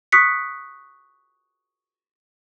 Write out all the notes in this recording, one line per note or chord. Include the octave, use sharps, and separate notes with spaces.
C#6 D#6 F#6 B6 C#7